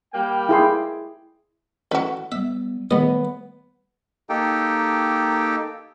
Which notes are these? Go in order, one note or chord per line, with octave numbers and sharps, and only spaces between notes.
G3 A#3 G5
E4 G#4 C6
A1 F#4 B4
G3 B3 E5
D#2 G3 A3 B3 D#5
A#3 D#4 G4 A4 G5